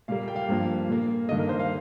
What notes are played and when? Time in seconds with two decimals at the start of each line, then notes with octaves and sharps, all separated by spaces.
0.08 A#2 G3 A#3 F5
0.28 G5
0.36 F5
0.49 G2 F3 A#3
0.89 A#2 A#3
1.29 G2 D#3 A#3 D#5
1.39 A#4
1.49 C5
1.59 F5